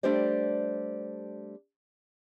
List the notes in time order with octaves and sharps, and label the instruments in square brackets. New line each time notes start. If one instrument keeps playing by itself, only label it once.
[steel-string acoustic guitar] G3 A3 D4 G4 C5 D5